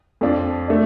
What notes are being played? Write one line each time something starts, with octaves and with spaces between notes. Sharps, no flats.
F2 F3 D4
A3 D4